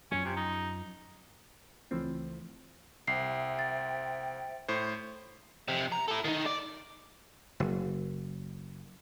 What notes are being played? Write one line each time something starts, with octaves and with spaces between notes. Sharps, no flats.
F#2 F3 C#4
C3
D#4
C#2 E3 F3 A3 C4
C2 C5 E5 G5 C7
A6
A2 C5
F2 C3
A#5
E4 A4
D#3 D#4
D5
F#1